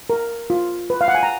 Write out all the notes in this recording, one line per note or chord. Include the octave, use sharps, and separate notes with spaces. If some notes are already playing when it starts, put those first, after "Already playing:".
A#4
F4
B4
F5
F#5
G#5
A#5